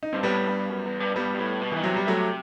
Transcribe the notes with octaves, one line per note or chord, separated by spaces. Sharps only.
D#4
G2 C4
A2 G3 B3
G2
F#2
E2
G2
G2 G3 B3
G2
A2
B2
D#3 E3
C3 F#3
G3
F#3 A3